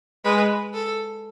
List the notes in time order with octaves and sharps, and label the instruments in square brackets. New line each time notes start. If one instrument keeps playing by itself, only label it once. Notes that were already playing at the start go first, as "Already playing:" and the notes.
[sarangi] G#3 [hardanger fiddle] B4
[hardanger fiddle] A4